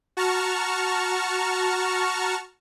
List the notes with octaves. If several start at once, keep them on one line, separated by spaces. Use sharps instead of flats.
F#4 A5 A#5 C#6 F6